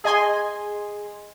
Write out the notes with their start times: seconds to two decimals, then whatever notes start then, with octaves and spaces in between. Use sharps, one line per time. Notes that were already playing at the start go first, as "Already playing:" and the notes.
0.04 G#4 D#5 G#5 C6